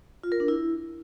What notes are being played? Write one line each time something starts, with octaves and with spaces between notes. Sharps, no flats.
F4
A#4
D4
E4